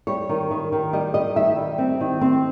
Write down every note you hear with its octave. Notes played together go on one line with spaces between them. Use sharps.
G3 C#5
D#3
D#3
D#3
G3 D#5
G3 D#5
D#3 E5
G3
C4
D#3
C4